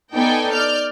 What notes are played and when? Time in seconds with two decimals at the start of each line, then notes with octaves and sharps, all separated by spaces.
0.14 B3 D#4 A4 D5 G5 G#5
0.53 D5 F6 G6